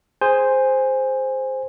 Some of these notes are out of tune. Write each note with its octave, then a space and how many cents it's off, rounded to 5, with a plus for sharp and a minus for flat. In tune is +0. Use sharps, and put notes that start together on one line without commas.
G#4 +0 C5 +0 G#5 -15